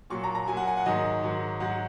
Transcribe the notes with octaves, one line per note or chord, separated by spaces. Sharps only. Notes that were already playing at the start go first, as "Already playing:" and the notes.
A#2 F#3 C#6
A#5
A#5
A#2 F#3 G#5
F#5
G#5
F#5
G#2 D#3 F#3 D#5
G#2 D#3 F#3
G#2 F#3 F#5